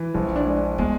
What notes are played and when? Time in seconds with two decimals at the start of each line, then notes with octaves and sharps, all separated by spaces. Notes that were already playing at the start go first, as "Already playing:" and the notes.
Already playing: E3
0.15 A#1 C#4
0.36 D4
0.46 G#3
0.78 G#3 B3